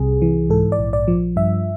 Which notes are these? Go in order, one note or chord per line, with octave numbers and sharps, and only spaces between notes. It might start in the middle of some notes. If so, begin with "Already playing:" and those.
Already playing: C2 C3 G#4
E3
G#2 A4
D5
A#1
D5
F3
G2 E5